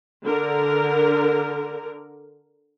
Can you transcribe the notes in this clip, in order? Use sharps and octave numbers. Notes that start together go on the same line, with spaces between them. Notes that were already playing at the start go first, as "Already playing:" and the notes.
D3 A#4